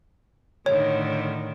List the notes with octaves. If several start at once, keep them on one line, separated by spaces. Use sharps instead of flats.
A2 D3 D#3 C#5